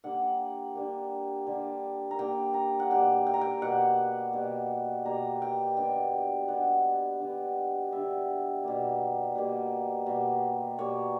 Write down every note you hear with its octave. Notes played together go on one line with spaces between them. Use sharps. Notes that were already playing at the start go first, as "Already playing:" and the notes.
D3 G3 A#3 F#5
D3 G3 A#3
D3 G3 A#3
A#5
D3 G3 A#3 G5
A#5
F#5
B2 G3 A#3 G5
G5
A#5
G5
B2 G3 A#3 F#5
B2 G3 A#3
B2 G3 A#3 A#5
G5
D3 G3 B3 G5
D3 G3 B3 F#5
D3 G3 B3
D3 G3 B3 E5
B2 G3 A#3
B2 G3 A#3
B2 G3 A#3
B2 G3 A#3 C#5